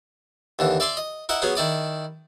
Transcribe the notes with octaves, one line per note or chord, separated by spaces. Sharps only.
D#2 D3 E3
D5 E5 G#5 C6 D6
D#5
E4 A#4 D#5 F#5
F#3 B3 C#4 G#4
D#3 E4 D5 D#6